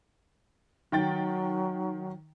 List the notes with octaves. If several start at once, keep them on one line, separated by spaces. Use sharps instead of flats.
D#3 F#3 G5 A6